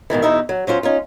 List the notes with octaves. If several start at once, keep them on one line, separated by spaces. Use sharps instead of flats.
G#2 B2 D#3 E3
E2 B2 D#4 E4 E5
F#3
F#3 C#4 F4 C5
C#4 D#4 F4